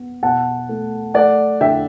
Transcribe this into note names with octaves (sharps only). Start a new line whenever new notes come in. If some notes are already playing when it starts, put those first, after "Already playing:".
Already playing: B3
B2 F#5 A5
A3
A3 D5 F#5
D3 E5 G5